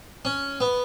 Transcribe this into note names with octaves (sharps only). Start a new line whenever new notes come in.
C#4
B3